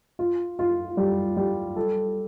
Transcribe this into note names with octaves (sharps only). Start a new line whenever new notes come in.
F4
F4
G3
G3
A4